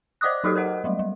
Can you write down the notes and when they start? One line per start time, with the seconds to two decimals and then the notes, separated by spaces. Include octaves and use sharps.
0.21 C5 D5 D#5 D6 D#6 F#6
0.44 F#3 D#4 F#4 G4 A4 D#5
0.55 A#4 C5 D#5 F#5
0.84 F#3 G3 A3
0.99 G3